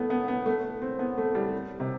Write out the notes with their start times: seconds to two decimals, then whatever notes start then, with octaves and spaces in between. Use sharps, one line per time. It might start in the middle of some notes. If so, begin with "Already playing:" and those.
Already playing: A3 B3
0.10 B3
0.28 B3
0.46 A3
0.82 C4
0.99 B3
1.17 A3
1.35 G3
1.80 C3